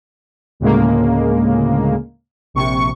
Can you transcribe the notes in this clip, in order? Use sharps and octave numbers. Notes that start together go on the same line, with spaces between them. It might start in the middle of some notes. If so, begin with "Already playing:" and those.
D2 A2 C#3 G#3 A#3
A#1 C3 C#6